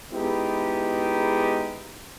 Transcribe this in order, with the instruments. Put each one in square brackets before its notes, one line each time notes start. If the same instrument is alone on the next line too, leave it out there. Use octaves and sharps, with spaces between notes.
[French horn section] G#3 B3 D#4 E4 G4 G#4